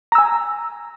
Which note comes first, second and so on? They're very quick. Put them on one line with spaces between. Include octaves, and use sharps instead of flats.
A#5 E6 G#5